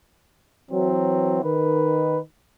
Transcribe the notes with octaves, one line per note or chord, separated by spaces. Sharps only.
E3 F#3 C4
D#3 B4